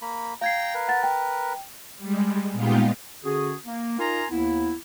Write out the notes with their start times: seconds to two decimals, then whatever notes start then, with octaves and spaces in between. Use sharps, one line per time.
0.02 A#3 B5
0.41 F5 G5 A#5 G#6 C7
0.74 A#4 B4
0.88 F#5 A6
1.03 G5
1.97 G3 G#3
2.52 A#2 G#3 B3 D#4 F4 G4
3.24 D3 C#4 F#4 G#4
3.66 A#3
3.98 D#4 F4 A#4 G#5 A#5 C6
4.30 D#2 A#3 B3 E4